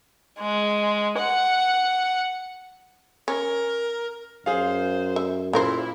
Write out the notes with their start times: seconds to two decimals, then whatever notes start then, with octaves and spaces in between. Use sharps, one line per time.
0.40 G#3
1.19 F#5
3.28 C#4 A#4
4.46 F#2 G#4 C5 F5
5.16 E5
5.53 A#2 C#3 E4 A#4 C5